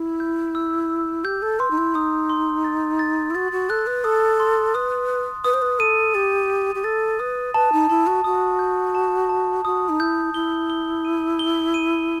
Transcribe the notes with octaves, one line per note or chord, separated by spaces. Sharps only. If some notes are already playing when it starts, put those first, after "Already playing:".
Already playing: E4
G6
E6
E6
G4 G6
A4
B4 C6
D#4
E4
D#4 D#6
C6
A6
A6
E4
F#4 A6
F#4
A4 F#6
B4
A4 D#6
C6
B4 D#6
D#6
B4 D#6
C5
B4
A4 D#7
G4 A6
D#7
G4
A4 A6
B4 D#6
B4 A5
D#4
E4 A5
F#4
F#4 D#6
G6
A5
A5
F#4 D#6
D#4
E4 G6
E4 G7
G7
D#7
G7
D#7